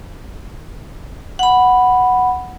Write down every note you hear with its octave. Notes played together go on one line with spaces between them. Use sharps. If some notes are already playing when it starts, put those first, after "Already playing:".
F#5 B5